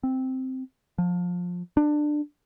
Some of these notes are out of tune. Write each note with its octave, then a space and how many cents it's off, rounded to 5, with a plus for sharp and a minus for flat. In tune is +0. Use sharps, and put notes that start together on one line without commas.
C4 -5
F3 +25
D4 +20